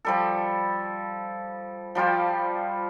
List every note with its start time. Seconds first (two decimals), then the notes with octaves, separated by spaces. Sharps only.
0.05 F3 G3 A4
1.95 F3 G3 F4 C5